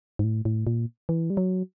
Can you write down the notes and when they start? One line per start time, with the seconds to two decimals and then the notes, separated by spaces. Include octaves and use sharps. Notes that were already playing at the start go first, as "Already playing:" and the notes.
0.19 G#2
0.24 A2
0.45 A2
0.67 A#2
1.09 E3
1.30 G3
1.37 F#3